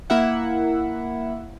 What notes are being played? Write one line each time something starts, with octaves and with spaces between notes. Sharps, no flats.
A#3 E4 E5 F#5